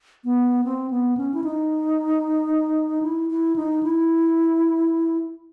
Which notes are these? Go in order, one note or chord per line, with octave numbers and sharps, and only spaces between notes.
B3
C4
B3
C#4
E4
D#4
E4
E4
D#4
E4